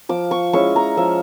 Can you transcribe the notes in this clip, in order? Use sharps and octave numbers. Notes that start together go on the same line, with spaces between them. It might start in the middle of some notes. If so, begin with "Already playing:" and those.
F3 D6
C#6
G#3 C#4 E4 C#6
A#5
F3 E5